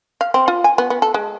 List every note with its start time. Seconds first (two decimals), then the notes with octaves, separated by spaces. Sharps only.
0.21 F5
0.34 C4
0.48 F4
0.64 G#5
0.78 B3
0.90 B3
1.02 A4
1.14 G#3